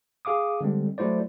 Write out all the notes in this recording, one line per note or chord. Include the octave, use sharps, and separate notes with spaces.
G#4 F5 D6 D#6
D3 G3 G#3 C4
F#3 A3 E4 C5 D5